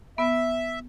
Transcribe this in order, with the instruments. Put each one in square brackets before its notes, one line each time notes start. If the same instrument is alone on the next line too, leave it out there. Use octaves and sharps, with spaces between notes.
[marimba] B3 [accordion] E5